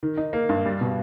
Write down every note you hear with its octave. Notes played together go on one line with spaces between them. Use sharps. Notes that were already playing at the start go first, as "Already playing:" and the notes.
D#3
D#4
A#3
G2
G3
B2